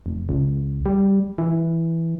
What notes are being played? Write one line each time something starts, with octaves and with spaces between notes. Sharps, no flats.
F1
C#2
G3
E3